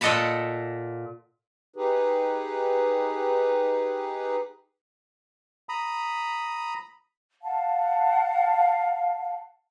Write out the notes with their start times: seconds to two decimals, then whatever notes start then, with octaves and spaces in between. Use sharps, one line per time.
0.01 A#2 A4 D#5 F#5 A5 B5
1.76 D#4 G4 G#4 B4
5.69 A#5 B5 D#6
7.43 F5 F#5 A5